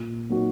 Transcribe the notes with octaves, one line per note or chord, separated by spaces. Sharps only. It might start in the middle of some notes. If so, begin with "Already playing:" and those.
Already playing: A#2
F#3 A#3 D#4 F#4